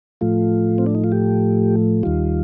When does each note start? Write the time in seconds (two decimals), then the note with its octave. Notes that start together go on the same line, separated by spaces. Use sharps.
0.21 A2 F3 A3 F4
0.78 C4
0.86 D4
0.95 D#4
1.04 F4
1.12 G4
2.03 D#2 D#3 G3 F4